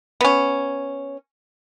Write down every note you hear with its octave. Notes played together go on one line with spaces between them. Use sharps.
B3 C#4